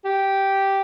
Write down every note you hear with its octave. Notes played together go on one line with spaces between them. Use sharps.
G4